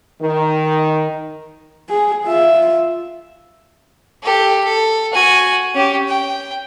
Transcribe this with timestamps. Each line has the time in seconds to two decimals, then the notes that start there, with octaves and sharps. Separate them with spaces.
0.21 D#3
1.89 G#4
2.25 F4 E5
4.23 G4 A4
4.64 A4
5.12 F#4 G#5
5.75 C#4 G4
6.08 G5